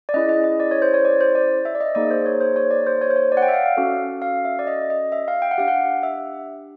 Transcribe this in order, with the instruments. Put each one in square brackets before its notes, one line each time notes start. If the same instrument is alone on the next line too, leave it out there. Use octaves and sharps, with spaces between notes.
[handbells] D5
C#4 E4 G#4 D#5
D#5
D#5
D5
C#5
C5
C#5
D5
C5
D5
E5
D5
D#5
A#3 D#4 G#4 D5
C5
C#5
C5
C#5
D5
C5
C#5
C5
C#5
D5
F#5
G5
E5
F5
F5
C#4 F#4 A4
F5
E5
D5
D#5
D#5
E5
F5
G5
F#5
D4 G4 F5
F#5
E5